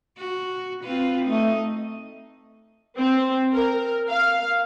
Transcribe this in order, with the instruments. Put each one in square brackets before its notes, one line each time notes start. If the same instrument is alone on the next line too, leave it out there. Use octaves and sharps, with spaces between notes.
[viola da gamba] F#4
C4 F4 B4
[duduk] A3 [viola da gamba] D#4 D#5
[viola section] C4
A#4
F5